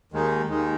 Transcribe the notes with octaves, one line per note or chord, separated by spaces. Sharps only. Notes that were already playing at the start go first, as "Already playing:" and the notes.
D#2 D#3 G#3 D#4
D#2 D#3 G#3 D#4